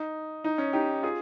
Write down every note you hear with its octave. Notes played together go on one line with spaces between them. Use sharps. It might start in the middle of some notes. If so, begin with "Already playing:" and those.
Already playing: D#4
D#4
C#4
D#4 G4
F4 G#4